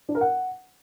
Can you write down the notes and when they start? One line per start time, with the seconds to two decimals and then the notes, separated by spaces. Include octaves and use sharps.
0.09 D4
0.15 A#4
0.21 F#5